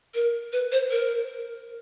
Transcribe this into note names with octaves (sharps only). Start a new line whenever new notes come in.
A#4
B4
C5
A#4